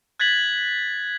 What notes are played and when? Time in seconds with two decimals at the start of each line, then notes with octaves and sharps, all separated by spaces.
0.20 F#6 G#6 A6 B6 F#7